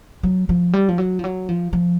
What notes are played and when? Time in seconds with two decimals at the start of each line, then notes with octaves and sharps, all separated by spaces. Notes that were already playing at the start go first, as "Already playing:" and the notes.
0.23 F#3
0.49 F3
0.73 G3
0.89 F3
0.98 F#3
1.19 F3
1.24 F#3
1.49 F3
1.73 F3